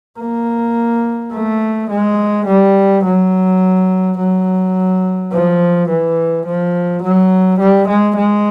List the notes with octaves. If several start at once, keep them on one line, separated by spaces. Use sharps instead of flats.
A#3
A3
G#3
G3
F#3
F#3
F3
E3
F3
F#3
G3
G#3
G#3